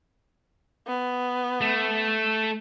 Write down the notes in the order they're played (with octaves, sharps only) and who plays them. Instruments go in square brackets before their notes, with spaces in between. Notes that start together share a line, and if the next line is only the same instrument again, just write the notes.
[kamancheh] B3
[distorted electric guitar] A3